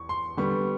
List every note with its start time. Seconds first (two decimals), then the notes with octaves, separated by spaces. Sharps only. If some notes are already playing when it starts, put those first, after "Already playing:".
Already playing: E2 C#6
0.09 C6
0.37 D3 G3 B3 C#6